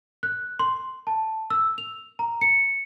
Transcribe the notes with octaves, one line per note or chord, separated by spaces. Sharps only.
F#6
C6
A5
E6
F7
A#5
C#7